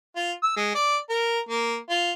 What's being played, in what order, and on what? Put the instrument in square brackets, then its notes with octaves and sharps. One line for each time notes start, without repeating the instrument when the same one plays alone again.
[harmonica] F4
E6
G#3
D5
A#4
A#3
F4